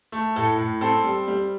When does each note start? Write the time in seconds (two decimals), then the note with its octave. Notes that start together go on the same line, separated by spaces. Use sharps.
0.12 A3
0.36 A2 A4
0.58 A2
0.81 C4 A4
1.04 G3
1.28 G3